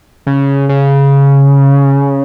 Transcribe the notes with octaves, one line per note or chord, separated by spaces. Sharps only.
C#3
C#3